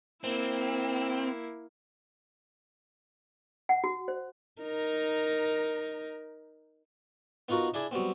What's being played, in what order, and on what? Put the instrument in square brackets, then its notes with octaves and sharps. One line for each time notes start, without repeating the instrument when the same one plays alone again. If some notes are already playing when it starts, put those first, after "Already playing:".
[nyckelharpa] A#3 E4 [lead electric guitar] C4
[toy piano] F#5
F#4
C5
[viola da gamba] D#4 A#4
[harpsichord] B3 D#4 F4 F#4 A#4
D4 E4 G#4 D5
F#3 G3 B3 C4